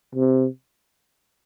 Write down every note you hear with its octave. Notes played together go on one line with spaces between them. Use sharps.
C3